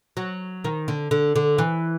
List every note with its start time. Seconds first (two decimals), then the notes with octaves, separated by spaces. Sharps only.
0.17 F#3
0.64 D#3
0.88 D3
1.11 D3
1.36 D3
1.58 E3